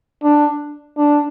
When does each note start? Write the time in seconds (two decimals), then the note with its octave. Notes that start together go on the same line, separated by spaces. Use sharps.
0.24 D4
0.97 D4